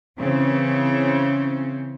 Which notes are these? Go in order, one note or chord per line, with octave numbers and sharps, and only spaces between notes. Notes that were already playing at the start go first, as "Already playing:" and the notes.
C#3 E3 C4 C#4